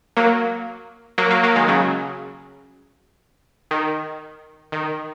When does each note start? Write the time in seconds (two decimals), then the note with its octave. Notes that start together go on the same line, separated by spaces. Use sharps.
0.17 F#3 A#3
1.18 F#3 A#3
1.30 F#3 A#3
1.43 F#3 A#3
1.56 D#3 G#3
1.68 C#3 F#3
3.71 D#3
4.72 D#3